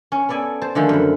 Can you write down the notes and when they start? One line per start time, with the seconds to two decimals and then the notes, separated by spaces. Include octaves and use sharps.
0.12 C#4
0.29 B3 A4 D5 G#5
0.62 C5 A5
0.75 D3 D#3 F3 G#3 A3
0.89 F#2 B5